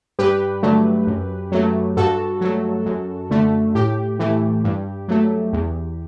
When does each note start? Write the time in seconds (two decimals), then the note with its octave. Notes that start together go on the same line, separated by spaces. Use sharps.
0.19 G2 G4 B4
0.63 D3 F#3 A3
1.07 F#2
1.52 F#3 A3
1.96 G2 F#4 A4
2.41 F#3 A3
2.86 F#2
3.30 D3 A3
3.75 A2 G4
4.19 E3 A3
4.64 G2
5.08 F#3 A3
5.53 E2